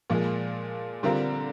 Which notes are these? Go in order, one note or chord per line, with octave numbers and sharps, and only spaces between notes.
A#2 F3 G#3
D3 G3 C4 F4 A#4